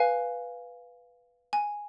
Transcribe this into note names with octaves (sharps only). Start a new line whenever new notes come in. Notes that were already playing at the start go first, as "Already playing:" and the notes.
Already playing: B4 F5 G#5
G#5